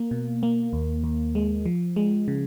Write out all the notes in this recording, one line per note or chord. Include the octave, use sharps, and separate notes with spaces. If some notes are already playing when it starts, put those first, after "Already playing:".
Already playing: A#3
B2
A#3
D#2
D#2
G#3
F3
G#3
C#3